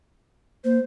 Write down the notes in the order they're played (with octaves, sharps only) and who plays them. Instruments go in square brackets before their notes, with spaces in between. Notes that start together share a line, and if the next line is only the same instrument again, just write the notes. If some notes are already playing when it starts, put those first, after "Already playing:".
[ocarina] A#3 [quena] C5